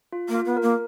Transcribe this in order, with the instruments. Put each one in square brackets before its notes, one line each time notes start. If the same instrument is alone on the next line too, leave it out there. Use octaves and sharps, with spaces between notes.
[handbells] F4
[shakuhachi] A#3
[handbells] F4
[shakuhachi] B3
[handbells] A#4
[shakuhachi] A#3